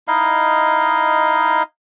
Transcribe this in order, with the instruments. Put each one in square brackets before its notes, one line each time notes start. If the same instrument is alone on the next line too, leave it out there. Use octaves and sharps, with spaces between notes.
[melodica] D#4 E4 D#5 F5